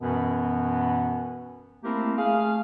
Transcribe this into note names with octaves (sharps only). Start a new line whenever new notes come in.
F#2 B2 E3 B3
A3 A#3 C4 E4 G4 A#4
A3 G#4 F5